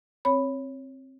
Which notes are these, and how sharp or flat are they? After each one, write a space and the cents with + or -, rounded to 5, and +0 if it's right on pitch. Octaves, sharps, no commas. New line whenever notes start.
C4 +20 C#5 +0 B5 +0